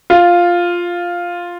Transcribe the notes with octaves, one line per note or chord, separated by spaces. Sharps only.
F4